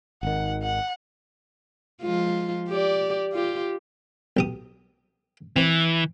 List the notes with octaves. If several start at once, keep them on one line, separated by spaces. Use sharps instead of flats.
G#1 D#3 F#5
F#5
F3 G#3 F4
G4 D5
F4 G4
B1 G4 D#6
E3 C4